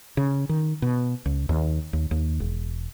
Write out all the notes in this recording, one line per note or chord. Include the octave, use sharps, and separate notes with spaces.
C#3
D#3
B2
C#2
D#2
D#2
D#2
E1